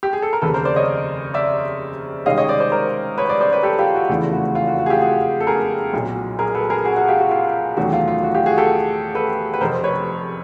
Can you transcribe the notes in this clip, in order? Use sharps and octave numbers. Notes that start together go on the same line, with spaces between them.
G4
G#4
A4
A#4
F1 D#2 C#3 A4 B4
A#4 C5
C5 D5
C#5 D#5
D5 E5
C2 C3 D#3 G#3 C#4 D#5 F5
C#5 D#5
C5 D5
C5 D5
A#4 C5
B4 C#5
C5 D5
C5 D5
B4 C#5
G4 A4
F4 G4
F#4
F1 E2 C#3 E3 A3 F4
F#4
F4
F#4
F#4
G#4
F4 G4
F#4 G#4
A4
G#4 A#4
B1 A#2 F#3
G#4 A#4
A4 B4
G#4 A#4
F#4 G#4
F#4 G#4
F4 G4
F#4
F4
E2 C3 D#3 F#3 A3 F#4
F4
F4
F#4
F4 G4
F#4 G#4
G4 A4
A4 B4
B4
F1 F2 C3 A#4 C5
B4 C#5